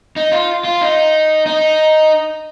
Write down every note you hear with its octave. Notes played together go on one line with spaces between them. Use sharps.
D#4
F4
F4
D#4
D#4